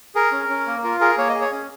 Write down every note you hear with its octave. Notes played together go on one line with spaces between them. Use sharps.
G#4 A#4
C#4
C#4
A#3
F4 A#4
G#4 A#4
A#3 C#5
D#5
G#4
C#5
C#4